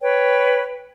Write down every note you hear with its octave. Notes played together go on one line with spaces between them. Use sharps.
B4 C#5 G5